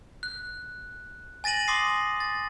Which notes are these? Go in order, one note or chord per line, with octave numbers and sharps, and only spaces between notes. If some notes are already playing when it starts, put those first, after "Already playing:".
F#6
G#5 A6 A#6 D#7 F#7
C6 D6 D#6 A#6 C7
A6